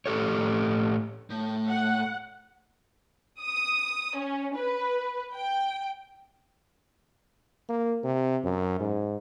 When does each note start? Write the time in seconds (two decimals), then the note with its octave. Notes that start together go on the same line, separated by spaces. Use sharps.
0.06 A2 G4 A4 C#5
1.30 A2
1.69 F#5
3.41 D#6
4.17 C#4
4.57 B4
5.35 G5
7.69 A#3
8.04 C3
8.44 F#2
8.80 G#2